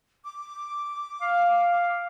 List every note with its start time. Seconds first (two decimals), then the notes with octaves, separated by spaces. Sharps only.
0.25 D6
1.22 F5